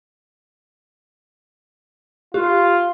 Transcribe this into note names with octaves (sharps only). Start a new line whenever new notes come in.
F4 G4